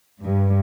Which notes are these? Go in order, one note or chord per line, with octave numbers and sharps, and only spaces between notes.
G2